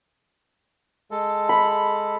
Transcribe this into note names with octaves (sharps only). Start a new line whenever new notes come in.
G#3 A4
B5